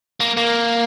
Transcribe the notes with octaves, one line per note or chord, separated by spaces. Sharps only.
A#3
A#3